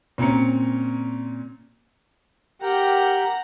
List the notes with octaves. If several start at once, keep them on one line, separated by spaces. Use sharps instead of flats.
A#2 C4 C#4 A#5 C#7
G4 A#4 F#5 G5 A#5